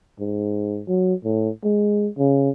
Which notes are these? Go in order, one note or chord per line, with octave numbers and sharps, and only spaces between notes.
G#2
F#3
A2
G#3
C#3